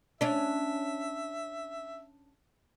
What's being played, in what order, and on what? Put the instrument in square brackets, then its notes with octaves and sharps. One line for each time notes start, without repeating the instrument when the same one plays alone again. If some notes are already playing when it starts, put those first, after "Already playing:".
[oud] C#4 D4 [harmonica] E5